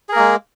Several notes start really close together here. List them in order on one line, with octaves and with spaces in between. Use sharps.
G#4 A#4 A#3 G#3